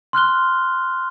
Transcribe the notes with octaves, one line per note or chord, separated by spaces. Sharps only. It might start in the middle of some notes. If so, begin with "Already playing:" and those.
C6 F6 F#6 G7